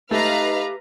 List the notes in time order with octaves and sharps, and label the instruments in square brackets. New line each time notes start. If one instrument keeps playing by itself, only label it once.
[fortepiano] A3 [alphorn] D#4 [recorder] G4 [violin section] B4 F5 A#5